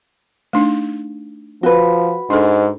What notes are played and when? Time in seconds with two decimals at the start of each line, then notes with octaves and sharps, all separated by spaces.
0.53 A3 D4 D#4
1.63 F3 F#4 B4
2.30 G#2 D4 A4